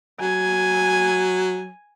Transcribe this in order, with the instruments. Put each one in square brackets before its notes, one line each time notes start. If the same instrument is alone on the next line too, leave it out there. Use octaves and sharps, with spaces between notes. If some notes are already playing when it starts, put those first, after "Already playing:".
[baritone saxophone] F#3 [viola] G#5